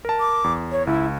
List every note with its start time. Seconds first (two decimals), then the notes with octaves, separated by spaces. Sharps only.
0.05 A#4 A5
0.20 D6
0.44 E2
0.72 C#5
0.87 C#2 E4